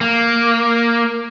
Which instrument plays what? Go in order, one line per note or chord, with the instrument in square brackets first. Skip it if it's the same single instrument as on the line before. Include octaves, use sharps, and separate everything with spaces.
[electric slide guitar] A#3